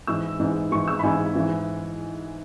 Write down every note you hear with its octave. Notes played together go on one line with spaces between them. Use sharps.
G#2 E3 E6
G#2 E3
G#2 E3 C#6
E6
B5
G#2 E3 G#5
G#2 E3